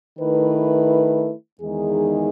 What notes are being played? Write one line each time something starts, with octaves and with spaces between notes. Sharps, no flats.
D#3 A3 E4 B4
E2 D#3 G#3 D#4 G#4